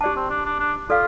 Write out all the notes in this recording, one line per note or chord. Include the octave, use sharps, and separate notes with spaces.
D4 G4 D5 A5
C4
D4
D4
D4
F4 A4 D5 F5